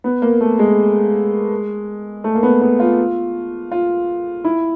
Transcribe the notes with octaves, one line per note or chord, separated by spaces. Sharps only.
B3
A#3
A3
G#3
A3
A#3
B3
B3
F4
F4
E4